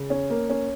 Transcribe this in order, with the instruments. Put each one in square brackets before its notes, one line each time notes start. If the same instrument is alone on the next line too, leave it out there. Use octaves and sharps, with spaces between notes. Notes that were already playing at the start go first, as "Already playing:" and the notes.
Already playing: [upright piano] C#3
C#4
A#3
C#4